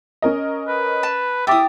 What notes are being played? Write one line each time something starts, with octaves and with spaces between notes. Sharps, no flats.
C#4 A#4 D#5
B4
A5
E4 G4 E5 D6 D#6 A6